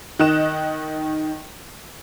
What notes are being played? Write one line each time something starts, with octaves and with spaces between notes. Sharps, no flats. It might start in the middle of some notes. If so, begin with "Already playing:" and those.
D#3 D#5 F#6 E7